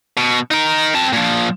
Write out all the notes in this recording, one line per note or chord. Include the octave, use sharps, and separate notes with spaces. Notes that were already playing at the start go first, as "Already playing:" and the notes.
B2
D#4 A#4
C4 A5
A#2 F3